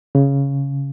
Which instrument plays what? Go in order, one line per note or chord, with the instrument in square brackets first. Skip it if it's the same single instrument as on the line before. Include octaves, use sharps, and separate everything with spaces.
[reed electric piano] C#3